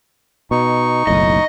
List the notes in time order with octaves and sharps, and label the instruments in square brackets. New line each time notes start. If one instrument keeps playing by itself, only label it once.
[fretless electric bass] B2 [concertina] D#4 C#6
[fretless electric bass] F#1 B1 A2 [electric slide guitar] D#5